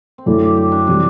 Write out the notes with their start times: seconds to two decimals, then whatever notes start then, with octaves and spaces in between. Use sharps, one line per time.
0.18 C4
0.26 F#2 D3 A3 D4 E4
0.41 G4
0.57 G4
0.72 D4
0.87 C3 E3 G3 D4